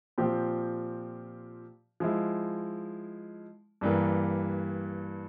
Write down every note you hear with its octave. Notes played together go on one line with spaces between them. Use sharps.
A#2 F3 C4 G4
F3 G#3 E4
G2 E3 G3 A#3